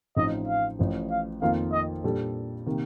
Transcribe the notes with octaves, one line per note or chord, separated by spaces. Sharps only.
A1 A2 F3 C4 D#4 D#5
F5
A1 A2 F3
F5
F2 D#3 A#3 F4 F5
D#5
A#2 G3 D4 A4
C3 D#3 A#3